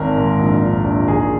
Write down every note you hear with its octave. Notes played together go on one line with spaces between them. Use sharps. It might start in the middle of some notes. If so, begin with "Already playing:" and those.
Already playing: G#1 D#3 A#4
G#2
A#1
A#1
A#1
D#3 G#4